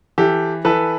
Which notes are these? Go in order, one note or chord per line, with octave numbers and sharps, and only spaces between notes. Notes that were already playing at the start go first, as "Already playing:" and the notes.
E3 G4 A4
E3 A4 B4